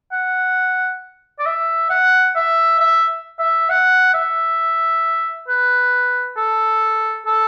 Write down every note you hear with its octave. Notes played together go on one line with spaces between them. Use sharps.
F#5
D5
E5
F#5
E5
E5
E5
F#5
E5
B4
A4
A4